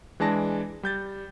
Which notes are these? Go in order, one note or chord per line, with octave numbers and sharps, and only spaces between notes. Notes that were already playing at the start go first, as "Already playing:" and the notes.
E3 G#3 D4 A5 A#6
G3 G6 A6